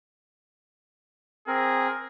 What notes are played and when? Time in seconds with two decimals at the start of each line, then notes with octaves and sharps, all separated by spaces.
1.47 C4 G#4 A#4